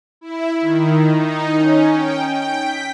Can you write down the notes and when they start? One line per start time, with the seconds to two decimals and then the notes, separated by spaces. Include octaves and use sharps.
0.21 E4
0.61 D#3
1.12 D#4
1.56 C#4
1.93 G5
2.32 G5
2.62 B6